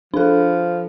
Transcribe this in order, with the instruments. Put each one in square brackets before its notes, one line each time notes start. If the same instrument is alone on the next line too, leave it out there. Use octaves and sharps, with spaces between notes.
[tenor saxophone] F3 [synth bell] D4 A4